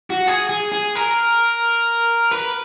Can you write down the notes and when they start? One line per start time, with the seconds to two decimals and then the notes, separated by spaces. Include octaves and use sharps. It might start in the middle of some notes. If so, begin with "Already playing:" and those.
0.10 F#4
0.27 G#4
0.49 G#4
0.72 G#4
0.95 A#4
2.31 B4